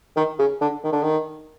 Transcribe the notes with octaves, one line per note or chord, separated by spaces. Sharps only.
D#3
C#3
D3
D#3
D3
D#3